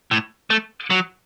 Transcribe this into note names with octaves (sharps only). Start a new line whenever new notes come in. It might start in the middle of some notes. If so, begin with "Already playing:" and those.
A2
A3
F#3